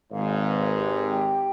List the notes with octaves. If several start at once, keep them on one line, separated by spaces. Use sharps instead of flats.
G#1 G#2 F5
B4
G4
G5